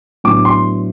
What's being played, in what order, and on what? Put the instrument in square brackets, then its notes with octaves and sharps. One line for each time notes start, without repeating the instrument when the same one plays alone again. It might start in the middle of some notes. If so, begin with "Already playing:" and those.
[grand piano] A2 F#3 B3 D4 D6
C6